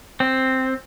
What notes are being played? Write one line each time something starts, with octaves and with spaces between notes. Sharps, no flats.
C4